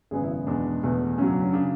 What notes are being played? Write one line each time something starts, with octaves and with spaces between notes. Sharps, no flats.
G#1 F#2 C#3 G#3 B3 G#4
E4
E2 B2 G#3 B3 D4
E2 B2 A3
F#2 C#3 F#3 C#4
D4
C#4
C#3 D4